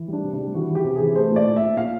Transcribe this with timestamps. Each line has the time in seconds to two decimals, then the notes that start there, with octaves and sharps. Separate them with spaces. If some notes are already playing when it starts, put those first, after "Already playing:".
Already playing: E3
0.08 G3 D4
0.24 C3
0.33 D4
0.39 G3
0.54 E3 F#4
0.70 E3
0.75 G4
0.84 C3
0.95 E3 G#4
1.15 A3 C5
1.31 A#2 D5
1.46 A#2
1.56 E5
1.62 A#2
1.77 A#2 F5